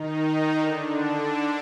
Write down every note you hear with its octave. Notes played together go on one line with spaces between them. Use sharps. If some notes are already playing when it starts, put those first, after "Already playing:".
Already playing: D#3 D#4
D3 D4